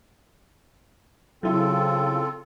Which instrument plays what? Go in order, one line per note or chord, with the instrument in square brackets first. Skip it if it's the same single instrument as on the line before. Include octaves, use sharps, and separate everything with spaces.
[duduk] C#3 [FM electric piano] F#3 E4 [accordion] C4 F4 A4